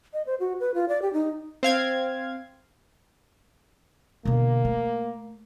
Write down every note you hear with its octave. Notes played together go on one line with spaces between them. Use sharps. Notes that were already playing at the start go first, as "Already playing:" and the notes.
D#5
C5
F#4
B4
F4
D5
G4
D#4
C4 F5 G#6
B2 D3 A#3
A3